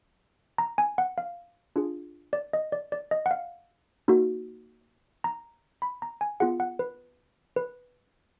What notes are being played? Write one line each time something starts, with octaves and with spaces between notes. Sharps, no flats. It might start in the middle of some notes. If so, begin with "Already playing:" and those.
A#5
G#5
F#5
F5
D4 F4 G#4
D5
D#5
D5
D5
D#5
F#5
F5
A#3 D#4 F#4
A#5
B5
A#5
G#5
B3 F4 G#4 F#5
F#5
B4
B4